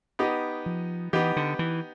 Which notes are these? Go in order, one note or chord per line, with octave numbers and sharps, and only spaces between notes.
B3 D#4 G4
F3
E3 B3 D#4 G4
D3
E3